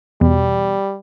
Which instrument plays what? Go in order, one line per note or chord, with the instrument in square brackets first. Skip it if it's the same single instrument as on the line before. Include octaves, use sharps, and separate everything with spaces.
[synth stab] E2 B2 [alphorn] G3